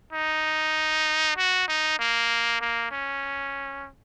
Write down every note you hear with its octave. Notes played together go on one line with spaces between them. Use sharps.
D#4
F#4
D#4
A#3
A#3
C#4